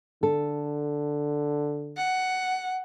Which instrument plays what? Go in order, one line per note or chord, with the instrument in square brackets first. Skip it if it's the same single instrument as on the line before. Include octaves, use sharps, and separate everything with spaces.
[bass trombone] D3 [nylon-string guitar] A4
[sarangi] F#5